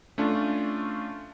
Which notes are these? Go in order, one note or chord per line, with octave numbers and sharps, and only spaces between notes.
A3 C#4 D4 F4